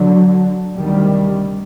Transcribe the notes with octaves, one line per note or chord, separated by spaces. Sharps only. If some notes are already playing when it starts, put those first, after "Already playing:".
Already playing: D3 F#3
D2 C3 D#3 G3